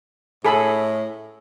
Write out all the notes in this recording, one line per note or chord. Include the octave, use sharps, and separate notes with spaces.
A2 G#4 A4 B5